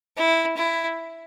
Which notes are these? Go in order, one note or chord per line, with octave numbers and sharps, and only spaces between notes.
E4
E4